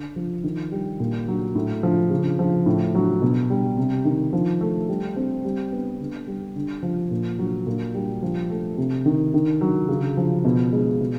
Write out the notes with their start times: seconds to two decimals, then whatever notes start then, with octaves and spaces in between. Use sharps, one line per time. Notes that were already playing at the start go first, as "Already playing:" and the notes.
Already playing: D3
0.16 F3
0.44 D#3
0.72 G3
1.00 A#2
1.28 F#3
1.55 A2
1.83 F3
2.10 C#3
2.39 F3
2.66 A2
2.95 F#3
3.22 B2
3.50 G3
3.78 C3
4.05 D#3
4.33 F3
4.61 A3
4.89 G3
5.16 C4
5.44 G3
5.72 B3
6.00 D3
6.27 G3
6.56 D3
6.83 F3
7.11 A#2
7.39 F#3
7.67 A#2
7.95 G3
8.23 F3
8.50 A3
8.77 C3
9.06 D#3
9.34 D#3
9.61 F#3
9.89 C#3
10.17 F3
10.45 B2
10.72 G#3
11.00 B2